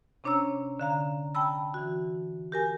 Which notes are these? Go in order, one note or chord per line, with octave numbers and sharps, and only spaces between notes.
C3 C#4 D4 C#5 A#5 E6
D3 F5 A#5
G5 A5 B5 E6
E3 F#4
G4 A#4 G#5